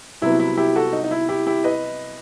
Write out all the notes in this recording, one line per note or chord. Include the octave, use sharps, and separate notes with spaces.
C2 C3 F#3 B3 E4
E4
E4 G4
F#4 A4
D#4
D#4
E4
E4 G4
E4 G4
B4 D#5